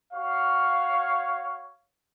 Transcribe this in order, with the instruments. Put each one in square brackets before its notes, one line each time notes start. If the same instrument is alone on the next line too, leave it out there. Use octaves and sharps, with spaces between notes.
[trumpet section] F#4 C#5 F5